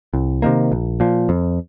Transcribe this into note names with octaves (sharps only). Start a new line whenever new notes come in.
C2
C3 D#3 A#3
A#1
A#2 F3
F2